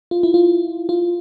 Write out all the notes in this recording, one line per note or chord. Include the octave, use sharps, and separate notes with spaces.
F4
E4
F4
F4